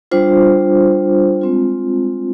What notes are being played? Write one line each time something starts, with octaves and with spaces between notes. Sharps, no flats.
G3 D4 F4 C5
G#3 C4 F4